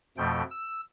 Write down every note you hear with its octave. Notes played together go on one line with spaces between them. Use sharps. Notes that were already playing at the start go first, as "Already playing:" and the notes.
F2 B2 F3 A3 G5
E6